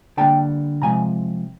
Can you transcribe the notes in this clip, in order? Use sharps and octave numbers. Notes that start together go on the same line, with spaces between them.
D3 G3 A#3 G5 A5
C3 F3 G#3 G#5 A#5